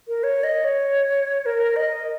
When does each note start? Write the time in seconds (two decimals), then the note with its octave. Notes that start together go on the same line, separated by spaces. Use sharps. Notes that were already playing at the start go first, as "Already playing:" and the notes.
0.08 A#4
0.24 C#5
0.43 D#5
0.64 C#5
1.46 A#4
1.76 D#5